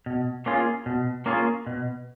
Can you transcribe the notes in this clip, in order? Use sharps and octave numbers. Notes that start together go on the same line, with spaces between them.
B2
A#3 C#4 F4 G#4
B2
A#3 C#4 F4 G#4
B2